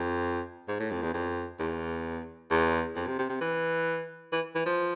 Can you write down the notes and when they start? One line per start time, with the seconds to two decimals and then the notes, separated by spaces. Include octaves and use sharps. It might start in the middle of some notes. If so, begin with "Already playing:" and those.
Already playing: F2
0.68 G#2
0.80 A2
0.91 F2
1.02 E2
1.14 F2
1.59 E2
2.50 E2
2.96 F2
3.07 C3
3.19 C3
3.29 C3
3.41 E3
4.32 E3
4.55 E3
4.66 F3